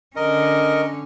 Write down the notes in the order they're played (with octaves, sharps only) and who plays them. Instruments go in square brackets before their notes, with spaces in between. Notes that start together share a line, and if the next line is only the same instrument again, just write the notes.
[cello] D3 C#4 [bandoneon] A#4 D#5